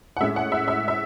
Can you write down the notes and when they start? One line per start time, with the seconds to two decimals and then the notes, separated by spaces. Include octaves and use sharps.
0.17 F#5
0.20 A2 G#3 C#4 E5
0.36 F#5
0.52 E5
0.68 E5
0.88 E5